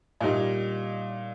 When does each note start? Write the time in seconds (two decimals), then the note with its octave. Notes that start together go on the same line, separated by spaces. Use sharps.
0.21 A#2 G3 D#4